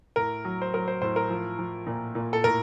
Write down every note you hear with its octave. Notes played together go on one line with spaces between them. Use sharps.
A2 A#4
F#3
C5
F#3 A#4
C5
A2 C5
A#4
F3
F3
A#2
A#2
A4
A2 A#4